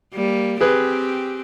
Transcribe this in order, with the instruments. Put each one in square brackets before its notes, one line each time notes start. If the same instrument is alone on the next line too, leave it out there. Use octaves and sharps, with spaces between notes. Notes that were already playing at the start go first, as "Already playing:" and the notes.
[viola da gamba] G3 A#3
[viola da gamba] C4 G4 [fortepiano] G#4 B4